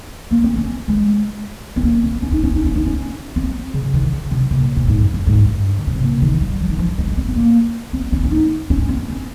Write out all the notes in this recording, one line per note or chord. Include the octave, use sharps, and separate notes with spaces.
A#3
C4
C#4
G#3
C4
A#3
C4
C#4
D#4
C#4
D#4
C#4
D#4
C#4
C4
C#3
D#3
C#3
C3
A#2
A#2
G#2
F2
G2
G#2
G2
D#3
C#3
C3
A#2
D#3
G3
F3
D#3
F3
G#3
C4
C4
A#3
C4
C#4
C#4
D#4
C#4
C4
C#4